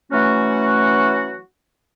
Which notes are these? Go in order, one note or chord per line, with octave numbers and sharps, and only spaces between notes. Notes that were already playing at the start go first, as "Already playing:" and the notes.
E3 F#3 A3 C#4 F#4